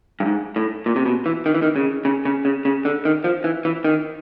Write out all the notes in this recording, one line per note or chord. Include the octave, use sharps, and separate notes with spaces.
G2
G#2
A2
A#2
C3
B2
E3
D#3
E3
D#3
C#3
C#3
C#3
C#3
C#3
D3
D#3
F3
E3
E3
D#3